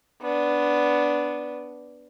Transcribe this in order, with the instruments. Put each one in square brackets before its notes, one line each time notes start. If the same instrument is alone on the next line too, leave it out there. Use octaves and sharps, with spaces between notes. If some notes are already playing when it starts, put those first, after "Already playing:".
[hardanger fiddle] B3 D4